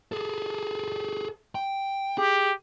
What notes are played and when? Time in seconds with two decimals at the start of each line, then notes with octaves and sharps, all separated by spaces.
0.12 G#4 A4
1.55 G5
2.18 G4 G#4